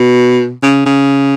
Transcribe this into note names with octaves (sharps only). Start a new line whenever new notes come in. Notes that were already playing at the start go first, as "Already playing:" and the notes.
Already playing: B2
C#3
C#3